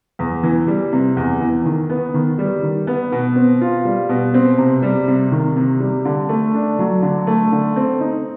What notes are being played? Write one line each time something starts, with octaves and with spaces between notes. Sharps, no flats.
E2
E3
G3
C3
E2
E3
D#3
B3
D#3
G3
D#3
B3
B2
C4
F4
G3
B2
C4
C3
G3
C3
D#3
C3
G3
D3
A3
D4
F#3
D3
A3
D3
C4
D#4